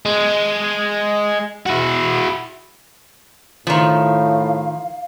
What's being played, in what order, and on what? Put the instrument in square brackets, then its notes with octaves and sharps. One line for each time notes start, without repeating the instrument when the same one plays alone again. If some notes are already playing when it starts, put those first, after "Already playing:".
[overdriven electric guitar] G#3
E4 F#4
[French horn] A2 [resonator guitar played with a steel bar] D#3 F3 [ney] F5